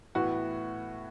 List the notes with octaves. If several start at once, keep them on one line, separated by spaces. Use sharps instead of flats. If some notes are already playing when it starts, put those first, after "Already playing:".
A2 E3 B3 F#4